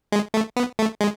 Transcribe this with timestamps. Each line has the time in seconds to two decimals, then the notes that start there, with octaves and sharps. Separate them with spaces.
0.12 G#3
0.34 A3
0.56 B3
0.79 A3
1.01 G#3